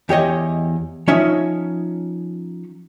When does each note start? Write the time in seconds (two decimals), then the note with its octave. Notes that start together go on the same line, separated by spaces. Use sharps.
0.09 E2 G4 C#5 D#5
1.08 F3 C#4 D#4 C#5 E5